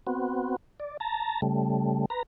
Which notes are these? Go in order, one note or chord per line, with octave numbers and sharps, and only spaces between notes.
B3 C4 F#4
D5
A5 A#5
C#3 G3 A3
B4 A#5